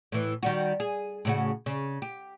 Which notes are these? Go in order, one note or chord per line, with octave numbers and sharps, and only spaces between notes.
A2 E3
D#3 G3 F#4
G#4
A2 C#3 F#4
C#3
G4